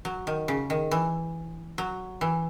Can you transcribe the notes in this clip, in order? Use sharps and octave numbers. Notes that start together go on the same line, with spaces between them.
F#3
D#3
C#3
D#3
E3
F#3
E3